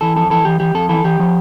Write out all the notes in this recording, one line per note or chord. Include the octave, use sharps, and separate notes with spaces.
E3 A4
F2 A4
E3 A4
E3 G4
E3 G4
F2 A4
E3 A4
E3 G4
F3